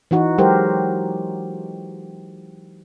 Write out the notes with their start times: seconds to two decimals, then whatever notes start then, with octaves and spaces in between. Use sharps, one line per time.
0.11 E3 D#4 F#4
0.38 F#3 G#3 G4 A#4 C5